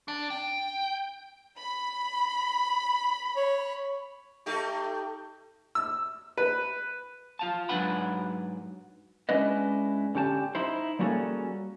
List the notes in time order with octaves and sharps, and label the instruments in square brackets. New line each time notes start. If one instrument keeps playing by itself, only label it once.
[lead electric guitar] D4
G5
[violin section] B5
[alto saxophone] C#5
[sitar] A3 D#4 G4
[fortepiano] E6
B4
[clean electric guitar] F4 F5 A5
G#2 F#3 D4 B4 F#5 B5
G#3 C#4 D4 E4 B4 D#5
D3 C#4 G4 A5
D#4 E4 C5
G3 A#3 C#4 F#4 G#4 A4